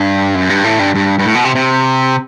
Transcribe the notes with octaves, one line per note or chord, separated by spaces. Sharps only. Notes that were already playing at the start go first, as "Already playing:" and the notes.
Already playing: G2
F#2
G2
A2
G2
G2
G2
A2
B2
C3
C3